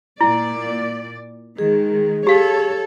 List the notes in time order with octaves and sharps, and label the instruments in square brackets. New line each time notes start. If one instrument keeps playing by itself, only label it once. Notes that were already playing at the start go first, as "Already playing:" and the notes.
[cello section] A#2 D5 [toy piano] E4
[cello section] D#3 G#3 [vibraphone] G#4
[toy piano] G4 F5 [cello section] A4 C#5